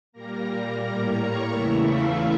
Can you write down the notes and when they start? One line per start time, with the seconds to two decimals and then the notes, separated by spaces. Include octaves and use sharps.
0.12 A#2 G3 A#3 A#4 A#5
0.82 A2 G3 A#3 A#4 A#5
1.17 C#5 C#6
1.52 E2 C#3 E3 A3 E4 E5
1.87 F4 F5